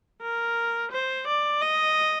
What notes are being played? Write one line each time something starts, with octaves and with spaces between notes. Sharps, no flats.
A#4
C5
D5
D#5